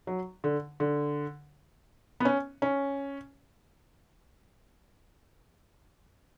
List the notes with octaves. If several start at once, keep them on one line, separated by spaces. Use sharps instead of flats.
F#3
D3
D3
B3
C#4
C#4